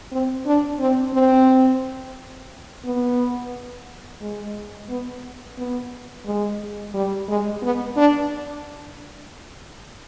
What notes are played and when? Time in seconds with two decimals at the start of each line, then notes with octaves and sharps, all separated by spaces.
0.12 C4
0.46 D4
0.80 C4
1.14 C4
2.85 B3
4.21 G#3
4.89 B3
5.58 B3
6.25 G#3
6.94 G3
7.28 G#3
7.63 B3
7.96 D4